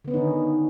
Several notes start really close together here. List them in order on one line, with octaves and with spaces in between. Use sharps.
D3 B3 C#4 D#4 D#3